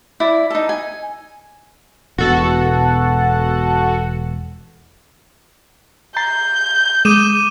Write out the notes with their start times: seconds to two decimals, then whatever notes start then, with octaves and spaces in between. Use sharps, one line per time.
0.20 E4 D5
0.50 D#4 A4
0.69 G#5
2.18 E1 B2 F#4 A4 F#5
6.17 A#5 G6 A6 C7
7.05 G#3 D6 D#6 D#7 E7